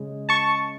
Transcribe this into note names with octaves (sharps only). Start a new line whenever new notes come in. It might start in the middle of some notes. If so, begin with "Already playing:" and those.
Already playing: C#3 G#3
A5 C#6